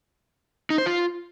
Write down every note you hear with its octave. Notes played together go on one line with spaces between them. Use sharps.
D#4
C5
F4